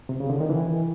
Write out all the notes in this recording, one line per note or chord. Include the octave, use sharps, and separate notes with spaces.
C3
C#3
D3
D#3
E3